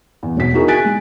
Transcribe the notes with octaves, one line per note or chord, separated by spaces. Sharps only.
E2
E1 B2 B6
D#4 E4 F#4 G#4 A#4
G#5 F#6 A6 B6 D7
G#3